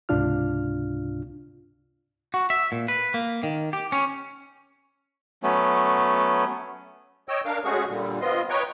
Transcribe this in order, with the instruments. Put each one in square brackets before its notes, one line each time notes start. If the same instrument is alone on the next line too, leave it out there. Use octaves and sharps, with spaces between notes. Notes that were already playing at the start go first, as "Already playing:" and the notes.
[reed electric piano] C#2 G#2 C3 D4 F4 F6
[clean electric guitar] F#4
E5
A#2
B4
A#3
D#3
G4
C#4
[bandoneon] F#3 A3 B3 C#4
[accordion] C#5 D#5 G5 E6
D4 A#4 F5
G#3 A3 C#4 F#4 G#4 C#6
A#2 D3 G3
B3 C4 F4 D#5 C6
B4 C#5 D#5 G5 A#5 C#6